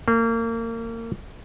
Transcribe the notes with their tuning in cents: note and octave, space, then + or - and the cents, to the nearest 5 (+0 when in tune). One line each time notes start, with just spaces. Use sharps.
A#3 -30